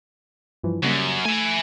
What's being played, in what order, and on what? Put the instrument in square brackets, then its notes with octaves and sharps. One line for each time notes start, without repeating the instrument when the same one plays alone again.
[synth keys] G2 E3 F3
[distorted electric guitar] F#2 [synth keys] C#3 G3 A#3
[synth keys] A3 [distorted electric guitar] E5 G#5